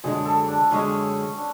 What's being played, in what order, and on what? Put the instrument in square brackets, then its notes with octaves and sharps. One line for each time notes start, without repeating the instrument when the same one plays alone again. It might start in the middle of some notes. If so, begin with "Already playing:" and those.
[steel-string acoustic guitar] F#2 D3 G#3 [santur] G#4
[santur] A4
D4
[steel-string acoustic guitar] F#2 D3 G#3 [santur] C#4
[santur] D4